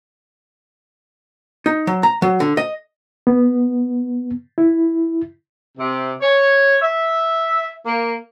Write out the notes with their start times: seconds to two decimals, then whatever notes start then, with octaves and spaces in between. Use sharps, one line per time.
1.66 D#4
1.87 F#3
2.03 A#5
2.22 F#3
2.40 D3
2.57 D#5
3.27 B3
4.58 E4
5.78 C3
6.22 C#5
6.82 E5
7.85 A#3